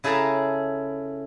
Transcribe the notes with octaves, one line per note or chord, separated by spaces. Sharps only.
C#3 E4 G#4 A4 A5 A#5